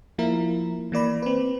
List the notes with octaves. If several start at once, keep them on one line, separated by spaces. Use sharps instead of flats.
F3 A#3 E4 A#4
E3 A#3 D5 B5
C4 B4